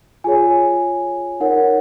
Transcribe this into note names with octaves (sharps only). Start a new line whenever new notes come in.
F4 G#4 C#5 G#5
D#4 A#4 C#5 F#5